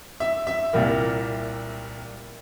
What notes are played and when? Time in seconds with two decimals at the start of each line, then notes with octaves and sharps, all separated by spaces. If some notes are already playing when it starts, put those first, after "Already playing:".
0.20 E5
0.47 E5
0.73 C2 A#2 G3 A#3